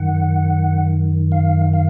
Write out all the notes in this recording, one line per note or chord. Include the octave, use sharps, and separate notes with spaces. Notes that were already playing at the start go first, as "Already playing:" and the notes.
Already playing: F#2 D#3 F#5
F5
F5